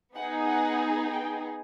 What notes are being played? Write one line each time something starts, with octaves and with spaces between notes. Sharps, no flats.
B3 D#4 G#4 F#5
F#5
G5